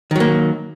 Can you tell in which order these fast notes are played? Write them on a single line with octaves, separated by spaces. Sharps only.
D#3 F#3 A#3